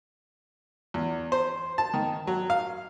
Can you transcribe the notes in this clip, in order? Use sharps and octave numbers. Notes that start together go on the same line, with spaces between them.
E2
C5
A5
D#3
F#3
F5